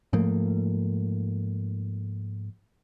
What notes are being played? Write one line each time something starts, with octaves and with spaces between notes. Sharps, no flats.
G#2 F3 A3 A#3